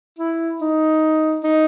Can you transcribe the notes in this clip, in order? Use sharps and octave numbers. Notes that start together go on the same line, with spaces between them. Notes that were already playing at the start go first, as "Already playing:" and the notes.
E4
D#4
D#4